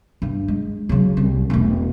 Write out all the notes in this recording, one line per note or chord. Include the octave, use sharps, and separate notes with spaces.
G2
G#3
C#3 F#3
C2
E1 A3